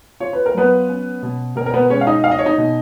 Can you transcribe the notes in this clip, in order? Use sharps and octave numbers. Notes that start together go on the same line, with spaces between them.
F4 C#5
B4
A#4
F#3 B3 B4
C#4
B2
B2 A#4
A#4
B3 B4
G#3 C#4 C#5
F5
D#4 D#5
D#4 F5
D#5
C#5
D#4 D#5
B2